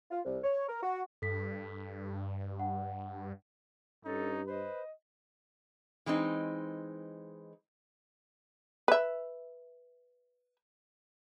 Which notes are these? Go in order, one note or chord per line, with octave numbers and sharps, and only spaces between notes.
F4
C2
C#5
A#4
F#4
G2 A4 B6
F#5
G2 C#4 D#4 A4
B4 C5 D#5
E3 G#3 C4 D#4
B4 E5